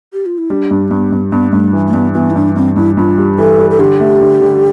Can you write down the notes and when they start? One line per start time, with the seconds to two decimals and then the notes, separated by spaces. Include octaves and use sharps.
0.13 G4
0.26 F4
0.38 E4
0.50 G3 D4
0.71 G2
0.91 G2 B3
1.12 G2
1.32 G2 B3
1.52 G2 A3
1.73 E3
1.88 A3
1.94 G2 B3
2.14 E3 B3
2.30 E4
2.36 G2 D4
2.56 G2 C4
2.76 G2 E4
2.97 G2 F4
3.18 G3
3.38 E3 A4
3.59 G3
3.71 A4
3.79 D3 G4
4.00 A3
4.21 D3
4.41 D3